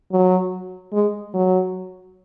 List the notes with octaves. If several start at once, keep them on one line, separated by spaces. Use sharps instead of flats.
F#3
G#3
F#3